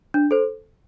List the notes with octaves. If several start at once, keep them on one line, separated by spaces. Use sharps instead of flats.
D4
A4 C5